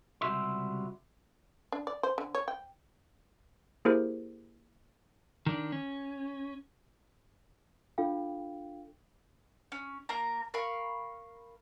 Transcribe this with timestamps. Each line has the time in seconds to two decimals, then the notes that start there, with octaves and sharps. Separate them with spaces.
0.21 C#2 C3 G3 F#4 E5 C6
1.72 D4
1.87 D5
2.03 C5
2.18 D3
2.35 C#5
2.48 G5
3.85 A#3 E4 G4 G#4 A#4 C5
5.46 D#3 D4
5.72 C#4
7.98 D4 F4 A4 F5 G5
9.72 C#4
10.09 A#3 A#4 A#5
10.54 A#4 F5 B5 C#6